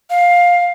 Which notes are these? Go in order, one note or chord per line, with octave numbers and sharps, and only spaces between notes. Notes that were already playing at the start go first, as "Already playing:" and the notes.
F5